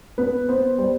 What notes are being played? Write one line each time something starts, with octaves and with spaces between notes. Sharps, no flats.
B3 B4
B3 C5
G3 C5